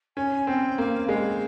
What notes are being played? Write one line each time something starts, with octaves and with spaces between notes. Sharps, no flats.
C#4 G#5
C4 G5
A#3 F5
G#3 F5